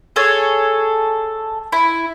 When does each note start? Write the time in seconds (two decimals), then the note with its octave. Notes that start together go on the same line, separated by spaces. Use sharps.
0.16 G#4 A4 C#5 G#5
1.72 E4